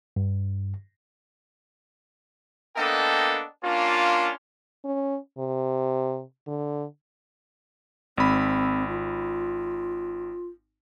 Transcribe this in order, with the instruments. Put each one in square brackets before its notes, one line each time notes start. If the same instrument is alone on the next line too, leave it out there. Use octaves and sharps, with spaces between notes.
[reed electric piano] G2
[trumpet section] A#3 B3 D4 A4 D#5 G5
A#3 C#4 D4 F4
[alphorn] C#4
C3
D3
[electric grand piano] G#1 B5 [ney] C4
[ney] F4